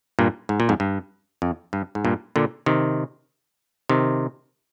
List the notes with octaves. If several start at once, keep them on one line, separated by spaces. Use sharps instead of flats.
G2 A#2
G#2
A#2
F2 G#2
G2
F2
G2
G#2
G2 A#2
A#2 D3
C3 D#3
C3 D#3